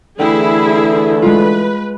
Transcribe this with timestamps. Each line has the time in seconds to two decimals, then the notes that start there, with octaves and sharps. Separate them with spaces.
0.20 D3 E3 A3 E4 G#4 G5
1.22 G#3 F4 B4